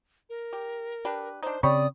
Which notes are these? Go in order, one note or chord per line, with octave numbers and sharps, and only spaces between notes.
A#4
G4
D4 G4 B4
D4 D#4 C5
C#3 C4 G4 C#5 D5 B5 D#6